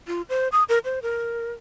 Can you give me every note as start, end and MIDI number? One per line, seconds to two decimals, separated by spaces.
0.08 0.22 65
0.29 0.48 72
0.52 0.64 87
0.69 0.79 70
0.85 0.99 72
1.02 1.53 70